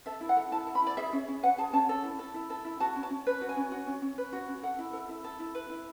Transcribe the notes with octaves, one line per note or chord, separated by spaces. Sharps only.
A4 E5
E4
F#5
A4
E4 A5
A4
B5
E4 D5
G#4 E5
C#4
C#4
B4 F#5
G#4 A5
C#4 A5
A4
E4
A4
E4
A4
E4
F#4 A5
C#4
A5
C#4
B4
F#4
G#5
C#4
F#4
C#4
C#4
B4
F#4
C#4
A4 F#5
E4
A4
E4
A4
E4
B4
E4